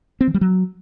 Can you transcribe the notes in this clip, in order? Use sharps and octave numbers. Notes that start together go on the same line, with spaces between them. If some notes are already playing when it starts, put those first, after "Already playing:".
C4
E3
G3
F#3